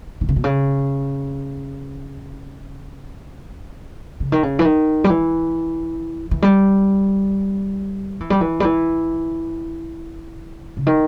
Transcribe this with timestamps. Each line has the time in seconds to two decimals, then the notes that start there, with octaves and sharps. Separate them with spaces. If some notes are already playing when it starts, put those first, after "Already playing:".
0.21 D#3
0.29 C#3
0.36 B2
0.44 C#3
4.20 C#3
4.32 D#3
4.43 C#3
4.59 E3
4.65 D#3
5.04 G3
5.10 E3
6.31 E3
6.42 G3
8.21 E3
8.30 G3
8.41 E3
8.60 G3
8.65 E3
10.77 C#3
10.87 D#3